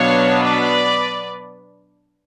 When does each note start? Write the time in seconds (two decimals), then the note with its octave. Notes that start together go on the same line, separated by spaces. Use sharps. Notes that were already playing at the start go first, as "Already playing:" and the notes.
Already playing: B2 F#3 B3 D4 C#5 F5
0.42 B4 D5